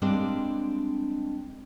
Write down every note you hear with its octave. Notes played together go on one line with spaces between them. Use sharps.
G3 G#3 A#3 C4 D4